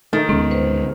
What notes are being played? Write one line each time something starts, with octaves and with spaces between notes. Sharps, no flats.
D#3 A3 D#4 A6
D2 G#2 C#3 G#3 B3 C#4
B4 C5